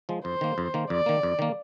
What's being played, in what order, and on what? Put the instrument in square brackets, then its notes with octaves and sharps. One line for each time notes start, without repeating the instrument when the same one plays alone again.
[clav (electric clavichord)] F3 G#3
[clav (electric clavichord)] F2 [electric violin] C5
[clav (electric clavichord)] D#3 A#3
F2
D#3 A#3
[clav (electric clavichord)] F2 [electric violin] D5
[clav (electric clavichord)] D#3 A#3
F2
D#3 A#3